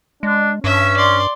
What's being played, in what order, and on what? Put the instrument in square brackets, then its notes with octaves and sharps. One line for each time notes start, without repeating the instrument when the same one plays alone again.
[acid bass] G#3 [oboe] D4
[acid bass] G2 [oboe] C#4 [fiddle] E5
[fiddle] D5 C6